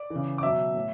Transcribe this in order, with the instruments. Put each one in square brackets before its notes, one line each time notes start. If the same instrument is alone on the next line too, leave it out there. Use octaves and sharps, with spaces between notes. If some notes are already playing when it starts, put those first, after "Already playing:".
Already playing: [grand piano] D5 D6
E3
C#3
D6
B2 F#3 E5 E6
A2